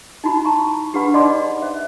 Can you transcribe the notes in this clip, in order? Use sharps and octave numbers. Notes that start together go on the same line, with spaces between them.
D#4 E4 F#4 B5
A5 A#5 C#6
D4 G4 G#4 B4 F#5 B5
D#4 D5 D#5 F#5 C6 D6
C5 E5